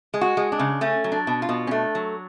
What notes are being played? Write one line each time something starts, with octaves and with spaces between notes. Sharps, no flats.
G#3
F#4
G#3
D4
C#3
A3 C#4
F#3
D4
B2
F4
B2
C#4
A3 D4
F#3